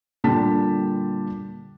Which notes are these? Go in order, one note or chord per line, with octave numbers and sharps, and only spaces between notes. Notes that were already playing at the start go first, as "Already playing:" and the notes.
A#2 D3 G3 G4 A5 B6